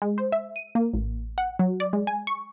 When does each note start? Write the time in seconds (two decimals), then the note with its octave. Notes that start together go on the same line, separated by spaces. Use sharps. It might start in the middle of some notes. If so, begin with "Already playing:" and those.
0.02 G#3
0.18 C5
0.32 E5
0.56 D#7
0.75 A#3
0.94 A1
1.38 F#5
1.59 F#3
1.80 D5
1.93 G#3
2.07 G#5
2.27 C#6